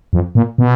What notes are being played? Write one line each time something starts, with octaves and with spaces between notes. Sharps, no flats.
F2
A#2
B2